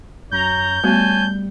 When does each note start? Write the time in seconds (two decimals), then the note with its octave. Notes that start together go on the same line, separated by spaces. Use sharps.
0.31 F#2 C#5 A#5 G6
0.84 G3 A3 B3 F#4 C#5 G#5 A5